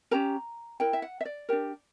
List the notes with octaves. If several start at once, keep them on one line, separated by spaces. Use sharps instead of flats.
C#4 G4 A#4 A#5
E4 A#4 G5
E5
F#5
E5
D5
D4 G4 A#4